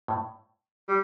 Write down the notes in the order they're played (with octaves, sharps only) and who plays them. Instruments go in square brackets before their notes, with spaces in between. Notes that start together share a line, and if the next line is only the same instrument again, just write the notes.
[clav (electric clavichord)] A2
[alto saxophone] G3